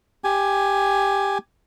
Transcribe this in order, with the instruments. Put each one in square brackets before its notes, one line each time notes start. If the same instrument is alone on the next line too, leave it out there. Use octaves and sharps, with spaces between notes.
[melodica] G4 G#5